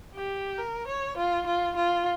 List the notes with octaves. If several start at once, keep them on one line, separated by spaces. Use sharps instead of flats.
G4
A#4
C#5
F4
F4
F4